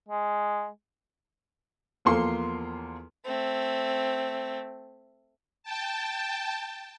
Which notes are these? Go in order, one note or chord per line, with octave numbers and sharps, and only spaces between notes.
G#3
E2 F3 A#3 A4 C6
A3 C4
G5 A5